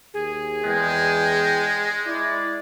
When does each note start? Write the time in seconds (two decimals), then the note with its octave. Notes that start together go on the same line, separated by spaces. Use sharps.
0.14 D#2 G#4
0.64 E2 G#3 G5
2.06 E4 D5